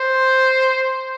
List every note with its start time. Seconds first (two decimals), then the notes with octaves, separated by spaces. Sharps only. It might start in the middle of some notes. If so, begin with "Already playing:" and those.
Already playing: C5